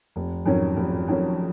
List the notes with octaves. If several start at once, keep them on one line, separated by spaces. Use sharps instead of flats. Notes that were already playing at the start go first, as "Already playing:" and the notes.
F1
F2 D#3 F#3 C#4
F1
F2 D#3 F#3 C#4